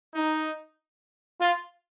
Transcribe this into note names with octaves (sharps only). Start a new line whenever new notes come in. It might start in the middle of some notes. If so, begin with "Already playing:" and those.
D#4
F4